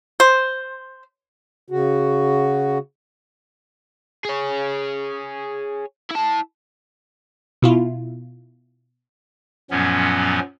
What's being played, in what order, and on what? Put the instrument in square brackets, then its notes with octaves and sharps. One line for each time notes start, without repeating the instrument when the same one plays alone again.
[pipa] C5
[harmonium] C#3 F#4
[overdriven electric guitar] G#4 C#5
E4 A5
[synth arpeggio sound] B2 E4 F4
[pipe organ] F#2 A#2 F3 F#3 B3 C#4